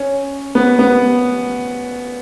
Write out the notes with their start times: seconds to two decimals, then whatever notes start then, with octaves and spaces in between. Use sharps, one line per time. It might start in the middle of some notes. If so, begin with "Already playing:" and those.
Already playing: C#4
0.55 B3
0.79 B3